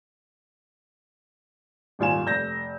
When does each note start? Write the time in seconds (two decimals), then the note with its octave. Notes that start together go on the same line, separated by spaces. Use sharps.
1.99 D#1 G#1 F4 G#5 E7
2.26 F1 G6 A#6